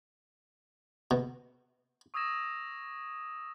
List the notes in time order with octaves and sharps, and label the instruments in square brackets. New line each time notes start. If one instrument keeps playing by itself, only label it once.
[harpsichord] B2
[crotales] C#6 D#6 E6 G#6 A#6 E7